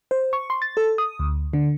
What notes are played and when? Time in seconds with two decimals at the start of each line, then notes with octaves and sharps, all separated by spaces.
0.11 C5
0.33 C#6
0.50 C6
0.62 A6
0.77 A4
0.98 D#6
1.19 D2
1.53 D3